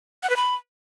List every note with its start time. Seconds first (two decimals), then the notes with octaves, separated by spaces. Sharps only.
0.23 F#5
0.30 B4
0.36 B5